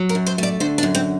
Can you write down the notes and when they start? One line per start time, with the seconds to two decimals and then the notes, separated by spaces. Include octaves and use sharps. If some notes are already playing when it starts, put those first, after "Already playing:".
Already playing: F#3
0.09 A#4
0.15 F#2
0.26 C5
0.38 A3 D5
0.60 D3 C5
0.78 D4
0.83 F#2
0.95 C4